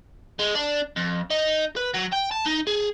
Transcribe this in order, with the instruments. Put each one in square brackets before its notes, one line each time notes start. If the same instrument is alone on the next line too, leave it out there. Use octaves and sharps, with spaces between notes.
[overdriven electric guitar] G#3
D4
F2
D#4
B4
F#3
G5
A5
D#4
G#4